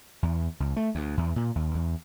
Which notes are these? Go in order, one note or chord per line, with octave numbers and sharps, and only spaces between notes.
E2
C#2
A3
D2
E2
A#2
D#2
E2